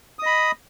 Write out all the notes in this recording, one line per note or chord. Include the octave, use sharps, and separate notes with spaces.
D#5 B5 D#6